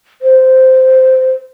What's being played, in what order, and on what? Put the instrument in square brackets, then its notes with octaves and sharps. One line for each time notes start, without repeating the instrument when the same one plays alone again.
[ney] C5